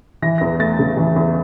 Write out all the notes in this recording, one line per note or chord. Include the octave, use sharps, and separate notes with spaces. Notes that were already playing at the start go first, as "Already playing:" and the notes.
E3 A#6
A#6
E2
A3 A6
C#3
E3
E2